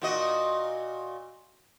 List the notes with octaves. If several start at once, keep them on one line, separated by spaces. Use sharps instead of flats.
A#2 F#4 D#5